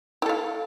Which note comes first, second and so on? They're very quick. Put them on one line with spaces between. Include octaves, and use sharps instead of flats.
E4 A4 F5